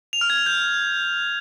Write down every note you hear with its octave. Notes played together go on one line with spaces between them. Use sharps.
F7
F6
G#6
F7
G6